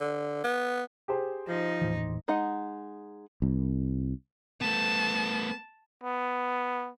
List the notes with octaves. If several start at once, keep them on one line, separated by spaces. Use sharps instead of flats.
D3
B3
G4 G#4 C5
F3 D#4
D#1 A2 E3
G#3 D#4 D#5 F#5
C2
A3 B3 A5
B3